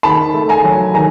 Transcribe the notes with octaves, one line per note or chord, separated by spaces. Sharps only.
D#3 A5 B5
A3
G#5 A#5
F#3
D#3 G#5 A#5